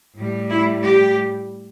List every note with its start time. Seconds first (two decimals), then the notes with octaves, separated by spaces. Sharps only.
0.17 A2 G3
0.51 E4
0.83 G4